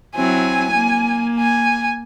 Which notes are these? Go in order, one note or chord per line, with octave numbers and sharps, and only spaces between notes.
F#3 C4 E4 G#5
A#3
G#5